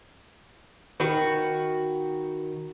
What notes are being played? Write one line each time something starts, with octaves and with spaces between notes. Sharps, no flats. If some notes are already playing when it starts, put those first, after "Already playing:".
D#3 F#4 B4